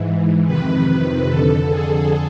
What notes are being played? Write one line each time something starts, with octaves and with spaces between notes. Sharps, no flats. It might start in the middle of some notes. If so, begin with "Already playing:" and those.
Already playing: G#2 E3
F2 C3 D#3 B4
F2 D3 A4
G#4